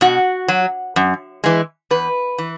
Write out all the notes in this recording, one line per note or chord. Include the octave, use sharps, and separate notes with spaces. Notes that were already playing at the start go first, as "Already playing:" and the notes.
B2 F#4
F#3
F#2
E3 G#3
E2 B4
E3